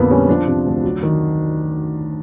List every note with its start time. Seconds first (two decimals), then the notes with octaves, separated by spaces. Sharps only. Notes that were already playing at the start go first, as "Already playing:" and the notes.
Already playing: A#1 F2 D3 A#3 B3
0.11 G3 C#4
0.29 F3 D4
0.47 C3
0.66 D2
0.84 F#3
1.03 D#3